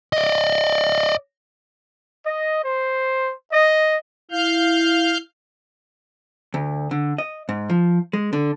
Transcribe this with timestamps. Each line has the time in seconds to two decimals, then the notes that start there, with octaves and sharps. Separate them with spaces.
0.13 D5 D#5
2.26 D#5
2.65 C5
3.51 D#5
4.31 E4 F5 F6 G6
6.54 D2
6.91 D3
7.18 D#5
7.49 G#2
7.70 F3
8.13 G#3
8.33 D3